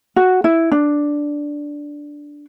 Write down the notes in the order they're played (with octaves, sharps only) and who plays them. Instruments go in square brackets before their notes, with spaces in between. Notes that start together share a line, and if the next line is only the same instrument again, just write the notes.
[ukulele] F#4
E4
D4